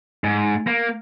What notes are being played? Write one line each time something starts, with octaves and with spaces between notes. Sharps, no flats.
G#2
A#3